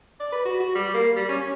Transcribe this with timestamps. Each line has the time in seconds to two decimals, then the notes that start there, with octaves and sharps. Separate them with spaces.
0.20 D5
0.32 B4
0.45 F#4
0.60 F#4
0.75 G3
0.94 A#3
1.16 G3
1.29 C#4
1.40 C#4